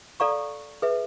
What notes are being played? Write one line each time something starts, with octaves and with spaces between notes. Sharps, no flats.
A4 D5 F5 A#5 C#6
G#4 B4 E5